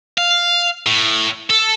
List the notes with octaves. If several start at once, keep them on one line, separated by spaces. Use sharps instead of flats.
F5
A2
A4